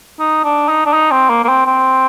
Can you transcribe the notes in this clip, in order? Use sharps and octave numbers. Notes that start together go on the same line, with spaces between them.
D#4
D4
D#4
D4
D#4
C4
A#3
A#3
C4
C4